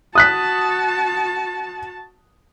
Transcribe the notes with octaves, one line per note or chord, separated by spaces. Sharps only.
F#4 A5 D#6 F#6 B6